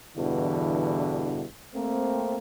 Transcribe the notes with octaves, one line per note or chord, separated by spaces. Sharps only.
E2 G2 B2 D3 E3
A3 A#3 C4